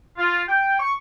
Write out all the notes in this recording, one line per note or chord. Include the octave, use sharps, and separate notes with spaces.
F4
G5
C#6